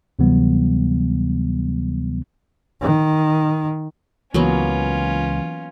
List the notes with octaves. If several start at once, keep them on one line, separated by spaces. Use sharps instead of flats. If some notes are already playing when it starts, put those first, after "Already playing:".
D2 C3 E3 F#3 G3 B3
D#3
C#2 E3 F#3 A#3 B3 C#4 F4